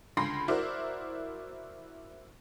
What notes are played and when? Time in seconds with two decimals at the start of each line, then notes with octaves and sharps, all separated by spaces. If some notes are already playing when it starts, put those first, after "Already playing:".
0.17 C#2 D3 B5 C6 A#6 C7
0.48 E4 F#4 A#4 C5 D5